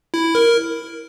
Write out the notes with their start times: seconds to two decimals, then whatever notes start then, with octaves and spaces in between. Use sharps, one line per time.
0.14 E4
0.35 A#4